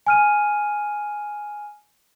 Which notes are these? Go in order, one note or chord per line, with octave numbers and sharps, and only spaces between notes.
G#5 F6 D#7